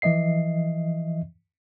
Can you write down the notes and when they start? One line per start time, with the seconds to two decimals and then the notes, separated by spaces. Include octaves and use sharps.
0.02 E3 F3 D#5 E5 C7